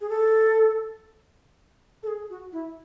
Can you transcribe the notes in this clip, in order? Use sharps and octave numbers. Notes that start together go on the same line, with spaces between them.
G#4
A4
A4
G#4
F#4
E4